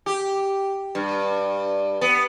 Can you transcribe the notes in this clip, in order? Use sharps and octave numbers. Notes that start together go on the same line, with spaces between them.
G4
G2
B3